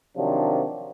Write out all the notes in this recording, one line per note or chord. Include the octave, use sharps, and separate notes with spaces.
C3 D#3 F3 F#3 D4